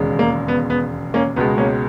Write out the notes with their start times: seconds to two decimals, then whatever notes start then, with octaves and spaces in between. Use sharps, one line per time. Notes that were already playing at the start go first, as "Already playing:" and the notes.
Already playing: E1 D#2 C#3 G#3
0.19 A#3
0.48 B3
0.70 B3
1.14 A#3 C#4
1.36 C#2 B2 G#3 B3
1.57 A#3 C#4